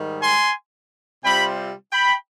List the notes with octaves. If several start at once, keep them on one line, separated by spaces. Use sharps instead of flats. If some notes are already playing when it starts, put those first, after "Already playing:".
Already playing: G#2 D#3 G3
G#5 C6
C3 G3 C4 F4 G5 B5
G5 B5